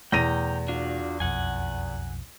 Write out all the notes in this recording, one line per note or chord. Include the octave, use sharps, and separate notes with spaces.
E2 B2 A3 G5 A#5 A#6 D#7
D4 F4 F#4
B1 F2 F#5 G#5